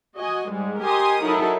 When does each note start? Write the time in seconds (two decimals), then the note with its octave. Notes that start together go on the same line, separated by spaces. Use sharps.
0.17 F#4 D#5 G#5
0.51 G#2 G3 G#3
0.81 G4 A#4 D#5 G#5 C6 D#6
1.23 F#3 D#4 E4 A4 A#4